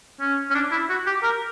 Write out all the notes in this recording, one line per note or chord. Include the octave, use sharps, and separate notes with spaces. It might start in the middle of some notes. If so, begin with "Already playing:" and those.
C#4
C#4
D4
E4
F#4
G4
A#4